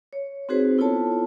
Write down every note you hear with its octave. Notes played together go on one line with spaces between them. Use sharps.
C#5
C4 D#4 F#4 G#4 B4 C5
B3 E4 F4 A4 C#5 A5